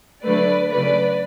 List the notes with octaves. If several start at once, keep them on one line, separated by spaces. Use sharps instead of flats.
D3 F#3 A3 B4 D5
C#3 F#3 A3 B4 D5